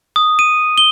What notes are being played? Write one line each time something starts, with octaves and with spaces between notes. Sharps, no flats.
D#6
D#7
G7